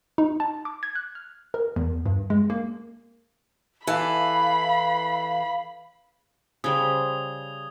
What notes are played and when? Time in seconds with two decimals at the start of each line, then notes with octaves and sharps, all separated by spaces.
0.18 D#4
0.40 A5
0.65 D6
0.83 G#6
0.95 F#6
1.15 F6
1.54 A#4
1.76 E2
2.06 G2
2.30 G#3
2.50 A#3
3.87 E3 A4 D5 F5 B5
6.64 C#3 G3 C5 D#6 G#6 G7